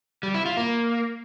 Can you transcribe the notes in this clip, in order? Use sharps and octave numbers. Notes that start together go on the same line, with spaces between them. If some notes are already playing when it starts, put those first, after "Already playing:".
G3
E4
F4
A#3